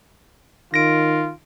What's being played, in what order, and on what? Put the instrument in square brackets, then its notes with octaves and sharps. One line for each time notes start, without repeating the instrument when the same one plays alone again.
[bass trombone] D#3 [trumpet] F4 [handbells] A#6 D7